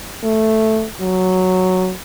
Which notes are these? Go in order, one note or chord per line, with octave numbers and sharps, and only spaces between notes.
A3
F#3